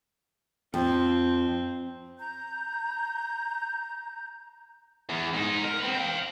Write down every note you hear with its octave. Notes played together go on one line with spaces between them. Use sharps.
F2 C4
A#5 G6
E2
G#2 D#4
A#4
C4 B4
F5 G5